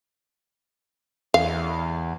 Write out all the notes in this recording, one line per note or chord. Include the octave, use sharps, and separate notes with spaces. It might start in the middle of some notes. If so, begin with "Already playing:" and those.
E2 F5